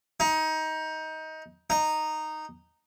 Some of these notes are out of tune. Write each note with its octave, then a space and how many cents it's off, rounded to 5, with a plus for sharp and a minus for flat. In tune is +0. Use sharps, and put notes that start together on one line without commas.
D#4 +20
D#4 -10